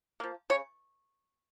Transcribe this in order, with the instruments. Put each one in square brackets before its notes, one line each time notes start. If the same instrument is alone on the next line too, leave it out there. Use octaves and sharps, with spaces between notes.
[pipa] F3 A#3
C#3 C#5